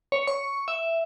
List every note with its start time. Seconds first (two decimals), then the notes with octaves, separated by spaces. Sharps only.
0.12 C#5
0.27 C#6
0.68 E5